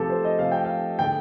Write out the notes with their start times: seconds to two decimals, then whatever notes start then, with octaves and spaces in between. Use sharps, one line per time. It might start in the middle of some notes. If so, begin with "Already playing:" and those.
Already playing: C3 F3 A3 G4 A4
0.10 C5
0.25 D#5
0.39 C3 F3 A3 F5
0.52 G5
0.65 F5
0.99 D3 A3 G5